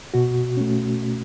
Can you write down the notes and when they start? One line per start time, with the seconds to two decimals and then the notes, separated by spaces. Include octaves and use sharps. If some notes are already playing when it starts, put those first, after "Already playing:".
0.14 B2 F#4
0.57 A3 C#4